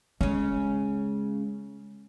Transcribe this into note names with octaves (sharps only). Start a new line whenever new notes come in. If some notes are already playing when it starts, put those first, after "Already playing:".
C#3 G#3 C#4